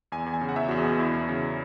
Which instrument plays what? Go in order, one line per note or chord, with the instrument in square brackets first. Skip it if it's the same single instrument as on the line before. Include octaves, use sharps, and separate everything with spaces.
[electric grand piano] E2 G#5
E2
G#5
C#3
F#5
E2 E5
E2 F#4
G#4
B2
E2 E4
E2
C#3